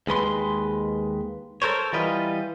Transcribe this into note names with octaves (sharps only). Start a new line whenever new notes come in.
D#2 G#3 B4 C6
A4 A#4 C5 C#5
E3 G3 F4 B4 D#5